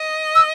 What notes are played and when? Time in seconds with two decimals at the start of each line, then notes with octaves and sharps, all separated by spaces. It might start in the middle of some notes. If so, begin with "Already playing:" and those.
Already playing: D#5
0.35 E6